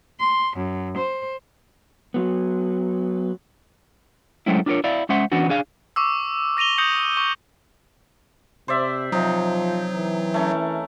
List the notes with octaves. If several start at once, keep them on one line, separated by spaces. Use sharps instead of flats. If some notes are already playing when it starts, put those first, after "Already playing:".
C6
F#2
C5
F#3 B3
F#3 G#3 A3 C4 C#4 E4
D4 F4 G4 A#4 C#5
E4 D5 F5
G#3 C#4 C5 E5 F#5 C6
E3 B3 C#4 D4 F#4
D4 G#4 F5
C#6 D6 E6
E6 A#6 D#7 F7 G7
D#6 G6 A#6 C#7 F7 F#7
C#6
C3 C5 D5 E5
C3 F3 F#3 D#4
E3
A3 C#4 A#4